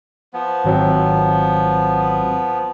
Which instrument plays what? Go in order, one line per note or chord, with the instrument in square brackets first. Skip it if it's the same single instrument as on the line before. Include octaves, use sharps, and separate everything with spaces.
[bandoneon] F3 B3
[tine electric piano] G#1 F#3 C4